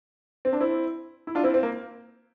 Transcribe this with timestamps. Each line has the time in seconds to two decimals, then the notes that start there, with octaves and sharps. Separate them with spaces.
0.45 C4
0.53 D4
0.60 C4 E4
1.27 E4
1.35 D4 F4
1.44 C4 E4
1.54 C4
1.63 A#3